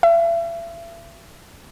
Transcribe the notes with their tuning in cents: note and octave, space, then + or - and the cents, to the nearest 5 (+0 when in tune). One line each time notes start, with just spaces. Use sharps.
E5 +40